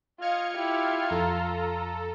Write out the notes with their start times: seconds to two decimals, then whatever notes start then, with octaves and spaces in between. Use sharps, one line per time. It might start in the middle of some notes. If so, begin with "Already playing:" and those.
0.21 F4 D#5 F5 F6 G#6 C#7
0.56 E4 G4
1.11 F2 A4 A#5